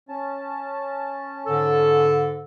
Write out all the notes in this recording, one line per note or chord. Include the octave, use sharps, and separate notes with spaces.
C#4 A5
G#2 D3 A4